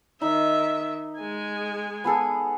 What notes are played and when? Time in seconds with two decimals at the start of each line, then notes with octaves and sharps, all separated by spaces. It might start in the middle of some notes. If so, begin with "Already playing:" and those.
0.21 D#3 D#4 E5
1.20 G#3 G#5
2.04 B3 G#4 A4